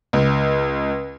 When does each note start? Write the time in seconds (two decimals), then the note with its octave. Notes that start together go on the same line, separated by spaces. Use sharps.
0.13 C#2